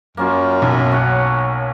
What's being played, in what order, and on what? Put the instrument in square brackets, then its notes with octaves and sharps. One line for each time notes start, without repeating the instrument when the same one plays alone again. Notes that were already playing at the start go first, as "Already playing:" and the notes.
[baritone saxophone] F#2 [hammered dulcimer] A#3 C#4 F4
[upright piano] B1
[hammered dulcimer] C#5 F#5